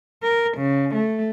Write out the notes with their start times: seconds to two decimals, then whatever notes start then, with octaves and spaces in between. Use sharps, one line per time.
0.22 A#4
0.58 C#3
0.95 A3